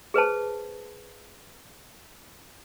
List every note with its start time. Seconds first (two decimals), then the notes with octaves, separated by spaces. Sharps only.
0.14 G#4 B4 C5 A5